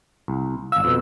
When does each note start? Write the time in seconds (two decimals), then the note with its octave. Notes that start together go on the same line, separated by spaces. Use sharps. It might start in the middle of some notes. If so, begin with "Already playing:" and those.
0.28 C2
0.72 G#1 F5 E6
0.84 F2 B2